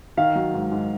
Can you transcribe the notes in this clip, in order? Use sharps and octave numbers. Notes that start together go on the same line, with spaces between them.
D#3 F5
F#3
G#2
G#2